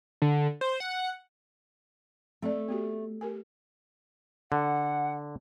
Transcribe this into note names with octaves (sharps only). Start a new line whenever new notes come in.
D3
C5
F#5
A3 C4 D5
B3 F#4 G4
G4 A#4 G#5
D3 F#5